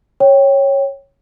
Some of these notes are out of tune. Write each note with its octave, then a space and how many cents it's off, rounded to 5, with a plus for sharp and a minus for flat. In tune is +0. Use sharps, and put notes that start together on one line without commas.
C#5 -10 G5 +0